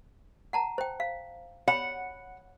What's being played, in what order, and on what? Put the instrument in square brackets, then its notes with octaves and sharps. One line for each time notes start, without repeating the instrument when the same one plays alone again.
[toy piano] F#5 A5 A#5
C5 G5
F5
[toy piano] C#5 B5 [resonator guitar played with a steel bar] F#5